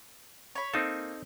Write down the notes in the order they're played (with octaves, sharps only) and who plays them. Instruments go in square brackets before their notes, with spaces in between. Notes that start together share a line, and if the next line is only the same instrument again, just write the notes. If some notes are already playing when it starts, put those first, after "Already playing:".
[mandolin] C#5 B5
[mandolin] A#3 [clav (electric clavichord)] C4 D#4 A4